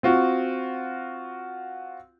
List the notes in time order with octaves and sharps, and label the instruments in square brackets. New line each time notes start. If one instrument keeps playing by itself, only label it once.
[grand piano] C4 F4 F#4